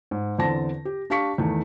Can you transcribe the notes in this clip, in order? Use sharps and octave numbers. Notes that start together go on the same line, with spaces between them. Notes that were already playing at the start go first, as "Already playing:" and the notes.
G#2
E2 D3 C4 A5 A#6
G4
D4 G4 F5 C#6 B6 C#7
E2 D#3 A3